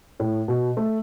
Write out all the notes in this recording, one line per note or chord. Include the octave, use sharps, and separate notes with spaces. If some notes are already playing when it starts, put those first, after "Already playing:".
A2
B2
A3